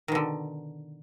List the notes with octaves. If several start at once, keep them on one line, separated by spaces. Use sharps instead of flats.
B2 D3 D#3